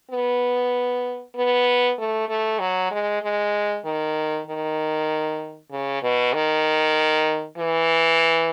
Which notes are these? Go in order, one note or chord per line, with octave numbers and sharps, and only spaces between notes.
B3
B3
A3
A3
F#3
G#3
G#3
D#3
D#3
C#3
B2
D#3
E3